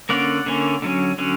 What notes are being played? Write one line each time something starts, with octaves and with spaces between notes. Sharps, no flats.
D3 A#3 C#4 D5 F#5
D3 A#3 C#4
D3 F#3 C#4
D3 F#3 C#4